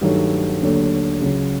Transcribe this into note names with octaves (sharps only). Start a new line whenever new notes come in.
G2 D#3 F#3 A3
D#2 D3 F#3 A3 D4
C#2 C#3 F#3